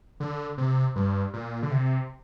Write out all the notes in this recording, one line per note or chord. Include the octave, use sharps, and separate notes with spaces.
D3
C3
G2
A#2
D3
C3